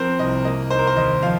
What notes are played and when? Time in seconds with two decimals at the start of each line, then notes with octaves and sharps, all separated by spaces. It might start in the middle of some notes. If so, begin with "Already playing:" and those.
Already playing: F3 C4 A#4 C5
0.19 C2 D#5
0.45 A#3 D#5
0.70 D#4 C5
0.79 A#4
0.87 C5
0.97 D#2 D#5
1.22 F3 F5